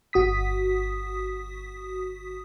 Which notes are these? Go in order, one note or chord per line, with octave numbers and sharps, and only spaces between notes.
G1 F#4 D#6 B6